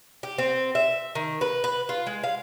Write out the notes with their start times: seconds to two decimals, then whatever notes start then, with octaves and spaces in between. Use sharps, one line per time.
0.23 G4
0.38 C4
0.75 E5
1.15 D#3
1.41 B4
1.64 B4
1.89 F4
2.07 G#3
2.24 F5